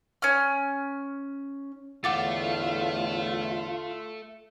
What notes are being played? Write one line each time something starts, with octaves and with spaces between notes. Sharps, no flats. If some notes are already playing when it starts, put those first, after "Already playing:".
C#4 F6
E2 A2 D3 A3 F4 F#5 D6 A6